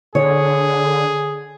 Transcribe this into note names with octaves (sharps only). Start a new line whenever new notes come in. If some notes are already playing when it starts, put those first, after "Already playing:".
D3 G#4 C#5